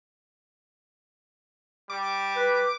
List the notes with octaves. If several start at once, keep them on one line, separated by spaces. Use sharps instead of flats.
G3 D6
B4